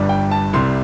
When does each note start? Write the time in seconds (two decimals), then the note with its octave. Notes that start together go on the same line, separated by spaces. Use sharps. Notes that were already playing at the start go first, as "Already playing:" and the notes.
Already playing: G1 G2 G3 D4
0.09 G5
0.31 A5
0.53 C2 C3 G3 C6